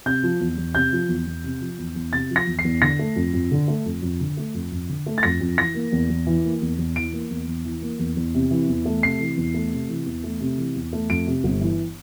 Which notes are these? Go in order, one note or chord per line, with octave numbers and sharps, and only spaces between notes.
C3 G6
F3
E2
E2
C3 G6
F3
E2
E2
C3
F3
E2
E2
C3 A6
F3
A#6
E2
C7
E2
D3 A#6
A3
F2
F2
D3
A3
F2
F2
D3
A3
F2
F2
D3
A3
A6
F2 A#6
F2
E3 A#6
A#3
E2
E2
E3
A#3
E2
E2
E3 D7
A#3
E2
E2
E3
A#3
E2
E2
C3
E3
E2
A3
C3 C7
E3
E2
A3
C3
E3
E2
A3
C3
E3
E2
A3
F2 D7
C3
G1
E3